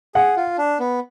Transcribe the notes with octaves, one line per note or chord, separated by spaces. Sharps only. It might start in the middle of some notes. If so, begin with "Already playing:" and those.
G#4 F#5
F4
D4
B3